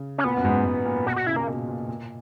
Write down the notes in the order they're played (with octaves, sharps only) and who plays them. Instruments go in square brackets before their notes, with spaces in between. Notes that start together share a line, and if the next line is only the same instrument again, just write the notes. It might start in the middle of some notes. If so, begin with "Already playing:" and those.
Already playing: [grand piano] C#3
[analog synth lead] C#4
[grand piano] A#2 [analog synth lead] B3
[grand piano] F#2
G#2
G#2
A#2
[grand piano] B2 [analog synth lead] F#4
[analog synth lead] F#4
[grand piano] C#3 [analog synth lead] E4
[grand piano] A#2 [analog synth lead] A#3
[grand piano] B2
A#2
A#2